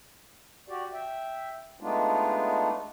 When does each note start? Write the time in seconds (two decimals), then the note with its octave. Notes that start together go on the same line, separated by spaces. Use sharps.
0.68 F#4 G4 D5
0.93 E5 G5
1.80 G#3 A3 B3 D4 D#4 F4